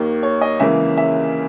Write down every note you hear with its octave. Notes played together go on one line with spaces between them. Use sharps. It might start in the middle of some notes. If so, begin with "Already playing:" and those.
Already playing: D#2 D#3 A#3
C#5
D#5
C#2 C#3 E3 A#3 E5
E5